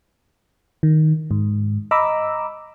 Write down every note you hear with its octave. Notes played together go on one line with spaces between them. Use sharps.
D#3
G#2
D#5 A#5 B5 D6 E6